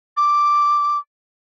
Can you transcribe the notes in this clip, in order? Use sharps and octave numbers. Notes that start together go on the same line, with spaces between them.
D6